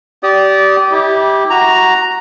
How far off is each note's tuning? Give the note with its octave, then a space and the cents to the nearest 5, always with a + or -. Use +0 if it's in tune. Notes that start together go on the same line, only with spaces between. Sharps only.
G4 -20 D5 -15 D#6 +0
E4 -30 G4 +0
F#4 +0 A#5 +0